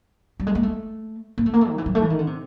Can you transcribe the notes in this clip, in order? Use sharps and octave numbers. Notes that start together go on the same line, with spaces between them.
G3
G#3
A#3
A3
A#3
A3
A#3
A3
D#3
E3
F#3
A3
E3
D#3
D3
C3